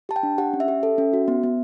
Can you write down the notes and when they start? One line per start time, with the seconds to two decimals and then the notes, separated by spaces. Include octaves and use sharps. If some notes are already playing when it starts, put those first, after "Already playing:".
0.09 G4 A5
0.16 G5
0.23 D4
0.38 G4 F#5
0.53 C#4
0.60 E5
0.68 G4
0.83 A4
0.98 C#4
1.13 F#4
1.28 B3
1.43 B3